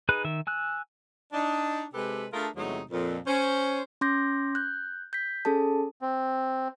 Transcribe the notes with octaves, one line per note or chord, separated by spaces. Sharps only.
D#4 G#4 B4 B5 F#6
D#3 E5
G#5 E6 F#6
D4 D#4
C3 G#3 G4 A4 B4
A3 D4 F4 G#4 A#4
E2 C3 F#3 G#3 A3 D#4
F2 A#2
C#4 C5
C#4 C6 D6 G6 A#6
F#6 G6
G6 B6
C#4 G#4 A4 A5
C4